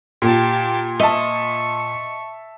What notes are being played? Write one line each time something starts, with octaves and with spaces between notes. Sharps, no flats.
A#2 G4 A5
D#5 E5 A5 C#6